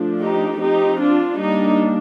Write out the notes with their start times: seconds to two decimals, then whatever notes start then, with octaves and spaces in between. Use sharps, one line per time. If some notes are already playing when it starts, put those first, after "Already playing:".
Already playing: F3 A3 D4
0.20 D#4 G4
0.60 F3 C4 D#4 G4
1.00 D4 F4
1.38 G3 A#3 D4 D#4